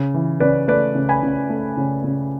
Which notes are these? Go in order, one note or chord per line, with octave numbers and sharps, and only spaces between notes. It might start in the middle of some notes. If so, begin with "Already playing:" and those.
Already playing: C#3
E3
C#3 B4 D5
A3 B4 D5
C#3
G#5 B5
C#3
A3
C#3
C#3